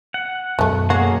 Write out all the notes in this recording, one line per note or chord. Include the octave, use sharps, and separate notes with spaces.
F#5
F#2 B2 G#3 A3
F#3 A#3 F#4 G#4